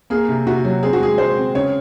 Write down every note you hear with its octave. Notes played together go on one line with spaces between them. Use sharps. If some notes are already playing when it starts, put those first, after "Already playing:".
A#3 G#4
C3
C3 F#4
F#3
C4 G#4
F#4
G#3 G#4
G#3 C5
C4
C#3 C#5